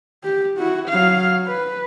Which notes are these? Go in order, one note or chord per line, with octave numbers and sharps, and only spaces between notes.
G4
E4 F#4
F#3 F5
B4